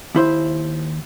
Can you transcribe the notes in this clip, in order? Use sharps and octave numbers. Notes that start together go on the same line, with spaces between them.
D#2 E4 C5